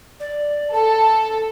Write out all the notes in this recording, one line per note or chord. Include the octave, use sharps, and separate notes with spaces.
D5
A4 A5